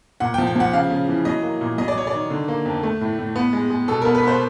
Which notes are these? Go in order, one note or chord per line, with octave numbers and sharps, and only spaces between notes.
A#2 F#5
G5
F3
G5
F3 F#5
C#3 F5
C#3
E3
F#3 D#5
A#3
A#2
F#3 D#5
D5
F#3 C#5
D5
D#3
D3
A#3
F2
A3
A2
A2
B3
G#3
G#3
B2 A4
B3 A#4
B4
B3 C5